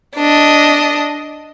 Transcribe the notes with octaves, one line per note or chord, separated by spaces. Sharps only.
D4 D#5